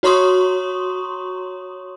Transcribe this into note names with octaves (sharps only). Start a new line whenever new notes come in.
F#4 C#5 A#5 C6 C#6 D#6